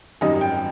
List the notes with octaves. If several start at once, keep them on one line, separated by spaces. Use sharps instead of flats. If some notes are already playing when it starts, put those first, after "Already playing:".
G#1 F#2 D#3 G3 D#5
G5